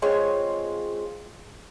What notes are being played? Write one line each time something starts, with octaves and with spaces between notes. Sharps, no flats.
G#3 C4 F4 C#5